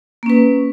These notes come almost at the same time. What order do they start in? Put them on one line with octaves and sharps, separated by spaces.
A#3 C#4 B4